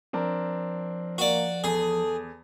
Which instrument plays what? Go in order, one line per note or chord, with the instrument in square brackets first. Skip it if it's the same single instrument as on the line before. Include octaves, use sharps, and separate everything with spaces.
[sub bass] F3 [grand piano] C4 D4 A#4
[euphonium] A#3 [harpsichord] F#4 D5
[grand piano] E2 [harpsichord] G#4 [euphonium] A4